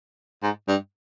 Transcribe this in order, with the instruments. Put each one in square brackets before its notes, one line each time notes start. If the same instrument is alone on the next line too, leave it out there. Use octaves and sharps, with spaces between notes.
[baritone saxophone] G#2
G2